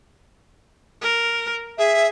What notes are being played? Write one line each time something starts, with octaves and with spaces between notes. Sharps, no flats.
A#4
G#4 E5